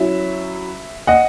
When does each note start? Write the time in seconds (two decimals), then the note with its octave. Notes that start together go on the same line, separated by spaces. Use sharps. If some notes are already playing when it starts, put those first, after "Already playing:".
Already playing: F#3 C#4 E4 E5
1.07 D#5 F#5